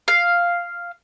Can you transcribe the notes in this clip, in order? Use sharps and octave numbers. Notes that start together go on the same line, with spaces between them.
F5